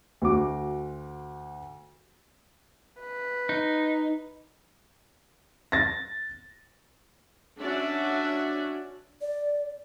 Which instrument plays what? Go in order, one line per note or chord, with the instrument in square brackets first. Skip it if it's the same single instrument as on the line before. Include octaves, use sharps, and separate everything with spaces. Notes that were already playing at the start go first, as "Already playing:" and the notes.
[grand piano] D2 F#4 D6
[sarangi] B4
[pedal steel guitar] D#4
[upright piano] A6 A#6
[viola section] C#4 D4 F#4 D5 E5
[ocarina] D5